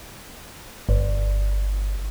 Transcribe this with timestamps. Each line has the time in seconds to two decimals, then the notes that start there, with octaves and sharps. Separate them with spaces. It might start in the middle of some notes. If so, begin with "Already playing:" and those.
0.89 G1